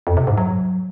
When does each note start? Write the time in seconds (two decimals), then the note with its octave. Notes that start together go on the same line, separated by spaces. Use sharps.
0.07 F2
0.17 C3
0.27 G#2
0.38 F#3